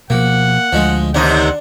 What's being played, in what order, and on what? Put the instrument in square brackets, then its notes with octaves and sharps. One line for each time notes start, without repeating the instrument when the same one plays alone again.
[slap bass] B2 F3 [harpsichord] A#3 [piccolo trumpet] F#5
[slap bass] D2 [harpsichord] F3 G#3
[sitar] D#2 C3 D#4 [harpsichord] D4 [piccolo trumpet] F#5